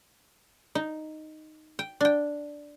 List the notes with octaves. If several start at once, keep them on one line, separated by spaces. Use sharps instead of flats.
D#4
G5
D4 G5